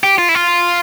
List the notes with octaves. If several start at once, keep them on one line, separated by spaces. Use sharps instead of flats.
G4
F4
E4
F4